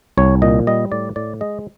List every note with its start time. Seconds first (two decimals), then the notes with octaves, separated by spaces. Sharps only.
0.17 C2 C#5
0.42 A#2 D#5
0.67 G3 D#5
0.92 A2 D5
1.16 A2 D5
1.41 G#3 D#5